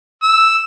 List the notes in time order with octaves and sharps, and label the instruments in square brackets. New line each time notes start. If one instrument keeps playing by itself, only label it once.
[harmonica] E6